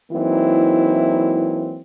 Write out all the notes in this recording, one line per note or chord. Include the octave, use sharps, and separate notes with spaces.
E3 F#3 A#3 C4 D#4 E4